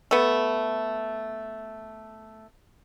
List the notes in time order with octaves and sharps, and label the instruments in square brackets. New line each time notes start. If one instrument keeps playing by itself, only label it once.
[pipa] A3 B3